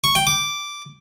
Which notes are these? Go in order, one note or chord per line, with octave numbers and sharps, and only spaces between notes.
C#6
G5
D6